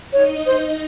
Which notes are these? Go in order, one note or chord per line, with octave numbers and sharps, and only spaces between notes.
D#4 C#5 D#5
C5